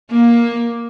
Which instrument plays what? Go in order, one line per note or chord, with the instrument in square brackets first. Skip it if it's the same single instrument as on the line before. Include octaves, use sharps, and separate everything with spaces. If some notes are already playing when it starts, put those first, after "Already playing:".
[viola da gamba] A#3